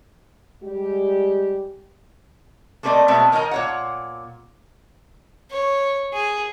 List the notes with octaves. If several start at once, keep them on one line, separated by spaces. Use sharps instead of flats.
G3 G#3 G4
A3 A#3 C4 B4 D5 D#5
B2 G#3 A3 B3 C4
D#3 A#4 C#5 D#5 G#5 A#5
A#2 C#5 F#5
C#5
G#4